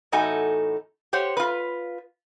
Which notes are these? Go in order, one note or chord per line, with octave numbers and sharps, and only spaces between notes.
E2 A2 D#4 F#4 A4 G#5
G4 C5 C#5 F#5
F4 B4